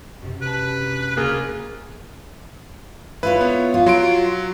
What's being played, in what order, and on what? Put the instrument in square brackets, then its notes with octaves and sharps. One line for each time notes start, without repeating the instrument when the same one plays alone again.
[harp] F#2 C3
[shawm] B4 [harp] A5 A#5
[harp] D4 A#5
[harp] D2 C#3 [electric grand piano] A#3 G#4 A#4 [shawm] F4
[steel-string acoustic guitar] E4 F4 C#5 [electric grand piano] B4
[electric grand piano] B3
[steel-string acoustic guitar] F4
[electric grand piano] F#3 C6 D7